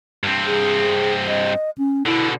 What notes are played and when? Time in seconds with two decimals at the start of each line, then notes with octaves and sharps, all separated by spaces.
0.23 G2 C4
0.46 G#4
1.27 D#5
1.78 C#4
2.06 B2 D3 E4